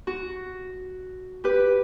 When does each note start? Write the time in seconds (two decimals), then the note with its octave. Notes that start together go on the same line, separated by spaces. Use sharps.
0.07 F#4
1.44 G4 B4